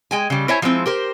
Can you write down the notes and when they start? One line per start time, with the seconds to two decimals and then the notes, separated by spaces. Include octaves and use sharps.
0.11 G#3 G5 G#5
0.30 C#3 G3
0.48 E4 C5 C#5 E5 G#5 A#5
0.62 F3 G3 G#3 C4 E4
0.86 G4 A#4 C5